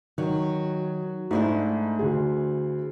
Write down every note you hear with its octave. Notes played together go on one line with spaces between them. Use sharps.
D#3 F#3
G#2 A3 D4 E4
D2 G#4